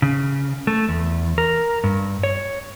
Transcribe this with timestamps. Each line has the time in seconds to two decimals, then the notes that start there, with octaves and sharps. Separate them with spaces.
0.02 C#3
0.67 A3
0.89 E2
1.38 A#4
1.84 G2
2.23 C#5